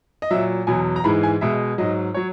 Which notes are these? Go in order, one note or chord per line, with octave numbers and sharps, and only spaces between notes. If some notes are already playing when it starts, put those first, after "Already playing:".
D#5
A#2 F#3 E5
E2 B2 F#3 G#5
A#5
G#2 E3 G#3 B5
G#5
B2 G#3 E5
G#2 F#3 D#5
F#3 C#5